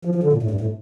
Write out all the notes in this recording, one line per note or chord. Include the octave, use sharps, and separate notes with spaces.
F3
F3
D3
A#2
A2
G2
A2